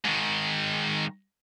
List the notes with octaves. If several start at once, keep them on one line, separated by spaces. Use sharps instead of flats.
G#2 D#3